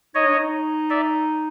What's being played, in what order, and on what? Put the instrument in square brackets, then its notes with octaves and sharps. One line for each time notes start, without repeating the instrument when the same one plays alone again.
[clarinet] D#4 [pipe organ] C#5 D#5
[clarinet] D4
D#4
[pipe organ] D5 E5